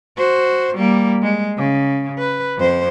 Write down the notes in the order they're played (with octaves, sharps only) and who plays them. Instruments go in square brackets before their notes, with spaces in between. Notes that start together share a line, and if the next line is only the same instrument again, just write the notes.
[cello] F#4 C5
G3 A#3
G#3
C#3
B4
F2 C5